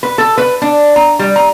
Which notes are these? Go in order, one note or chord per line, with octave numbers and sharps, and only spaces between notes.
B4
A4
B4
D4
A#5
G3
A#5